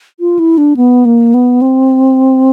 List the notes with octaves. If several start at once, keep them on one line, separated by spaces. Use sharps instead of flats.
F4
E4
D4
B3
A#3
B3
C4